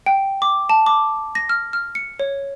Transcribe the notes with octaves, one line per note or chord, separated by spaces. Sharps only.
G5
D6
A5
D6
A#6
F6
F6
C#7
C#5